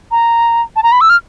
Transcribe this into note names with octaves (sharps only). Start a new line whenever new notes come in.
A#5
A5
A#5
B5
E6
F6